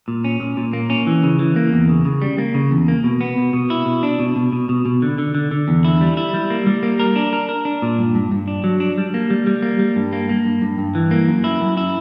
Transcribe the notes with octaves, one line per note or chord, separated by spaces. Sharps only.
A#2
C#4
A#2
A#2
A#3
C#4
E3
C#3
E3
A#3
E2
C#3
C#3
G3
A#3
C#3
E2
A#3
B2
B3
B2
B2
E4
B2
D4
B2
B2
B2
B2
B2
D3
D3
D3
D3
E2
E4
G3
E4
G3
A#3
G3
A#3
A#4
D4
A#4
A#4
D4
A#2
G2
G2
G2
D4
F#3
D4
G3
A#3
G3
G3
A#3
G3
G2
A#3
A#3
G2
G2
G2
E3
A#3
F#2
E4
F#2
E4